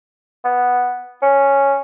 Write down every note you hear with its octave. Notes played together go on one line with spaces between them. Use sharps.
B3
C#4